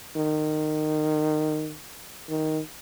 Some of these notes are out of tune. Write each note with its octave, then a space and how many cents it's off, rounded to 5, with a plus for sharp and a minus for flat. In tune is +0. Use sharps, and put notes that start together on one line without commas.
D#3 -20
D#3 +5